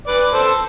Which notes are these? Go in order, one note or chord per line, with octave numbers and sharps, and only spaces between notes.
B4 D5
A4 C5